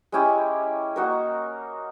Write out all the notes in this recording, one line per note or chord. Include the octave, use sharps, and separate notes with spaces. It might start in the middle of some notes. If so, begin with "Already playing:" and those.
G#3 C#4 E4 G4
A#3 D#4 F#4 A#4